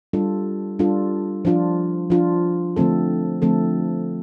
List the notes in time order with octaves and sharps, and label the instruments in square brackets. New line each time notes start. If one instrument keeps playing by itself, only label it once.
[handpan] G3 D4 F4 A4
G3 D4 F4 A4
F3 D4 F4
F3 D4 F4
D3 F3 A3 C4 A4
D3 F3 A3 C4 A4